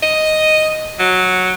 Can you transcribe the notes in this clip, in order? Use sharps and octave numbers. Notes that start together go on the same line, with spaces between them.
D#5
F#3